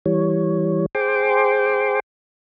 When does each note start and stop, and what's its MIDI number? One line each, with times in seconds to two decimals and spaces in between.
0.06 0.86 52
0.06 0.86 55
0.06 0.86 73
0.95 2.00 68
0.95 2.00 72
0.95 2.00 79
0.95 2.00 84
0.95 2.00 86